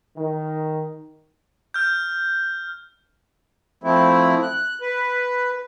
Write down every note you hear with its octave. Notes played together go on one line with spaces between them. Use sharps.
D#3
F6 G6
F3 A3 C4 E4
F#6
B4